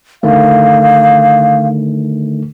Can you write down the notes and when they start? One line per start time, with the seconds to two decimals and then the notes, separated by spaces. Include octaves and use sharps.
0.23 D3 D#3 A3 F5